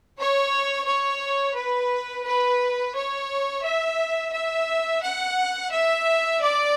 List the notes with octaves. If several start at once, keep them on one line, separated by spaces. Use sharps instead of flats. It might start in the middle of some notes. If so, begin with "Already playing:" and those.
C#5
C#5
B4
B4
C#5
E5
E5
F#5
E5
D5